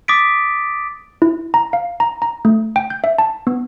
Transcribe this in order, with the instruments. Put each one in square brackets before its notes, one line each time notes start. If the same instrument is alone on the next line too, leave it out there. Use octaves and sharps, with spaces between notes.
[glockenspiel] D6 D#6 A6 B6 D7
[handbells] E4
A#5
F5
A#5
A#5
A3
G5
G6
E5
A5
B3